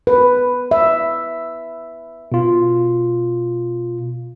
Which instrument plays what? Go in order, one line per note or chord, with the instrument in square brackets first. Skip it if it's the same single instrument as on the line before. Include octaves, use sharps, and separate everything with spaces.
[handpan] B4
E5
[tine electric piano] B2 F4